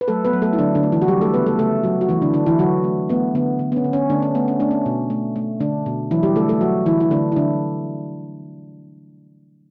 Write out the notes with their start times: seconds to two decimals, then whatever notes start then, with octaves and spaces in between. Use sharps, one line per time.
0.01 B4
0.08 F#3 A3 A4
0.25 B3 B4
0.33 F#3
0.42 A3 A4
0.53 E4
0.58 D3 F#3 D4
0.75 D3 D4
0.83 A3
0.92 E3 E4
1.02 F#4
1.08 F#3 G3 G4
1.21 A3 A4
1.34 C#3 B3 B4
1.46 A3 A4
1.59 C#3 A3 A4
1.83 F#3 F#4
2.01 F#4
2.09 E3 A3 E4
2.22 D3 D4
2.34 D3 D4
2.46 E3 E4
2.59 D3 F#3 F#4
2.84 A3
3.09 A3 B3
3.35 D3 B3
3.59 D3
3.72 B3
3.76 C#4
3.84 D3
3.93 C#4
4.10 D3 A3 D4
4.22 C#4
4.35 A3 B3
4.48 C#4
4.60 A3 D4
4.71 C#4
4.86 B2
5.10 A3
5.36 A3
5.60 D3 A3 D4
5.86 B2
6.11 E3 F#3 E4
6.23 G3 G4
6.36 D3 A3 A4
6.49 A3 A4
6.61 F#3 F#4
6.86 D3 E3 E4
7.00 E4
7.11 D3 A3 D4
7.32 E4
7.36 D3 F#3 D4